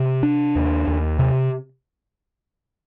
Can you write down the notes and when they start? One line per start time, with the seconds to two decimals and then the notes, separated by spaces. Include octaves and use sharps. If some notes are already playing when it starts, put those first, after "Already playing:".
Already playing: C3
0.23 D4
0.56 D#2
0.87 D#2
1.19 C3